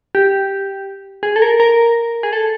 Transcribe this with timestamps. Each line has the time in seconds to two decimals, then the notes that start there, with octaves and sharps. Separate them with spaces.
0.15 G4
1.23 G#4
1.36 A4
1.42 A#4
1.60 A#4
2.23 G#4
2.33 A4